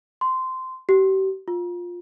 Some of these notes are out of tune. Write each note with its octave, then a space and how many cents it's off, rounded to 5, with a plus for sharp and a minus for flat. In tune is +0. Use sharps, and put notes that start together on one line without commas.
C6 -15
G4 -40
F4 +10